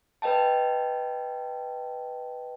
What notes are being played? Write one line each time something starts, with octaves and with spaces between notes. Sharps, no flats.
B4 D#5 G5 A5